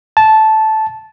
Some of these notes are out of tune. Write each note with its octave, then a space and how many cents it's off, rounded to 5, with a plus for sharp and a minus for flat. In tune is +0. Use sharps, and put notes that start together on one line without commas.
A5 -10